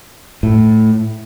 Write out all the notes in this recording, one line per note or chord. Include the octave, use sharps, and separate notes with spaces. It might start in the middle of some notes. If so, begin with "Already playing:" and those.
A2